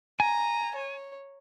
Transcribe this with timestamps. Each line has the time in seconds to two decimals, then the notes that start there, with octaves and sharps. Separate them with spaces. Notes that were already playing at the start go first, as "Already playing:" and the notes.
0.20 G#5 A#5
0.75 C#5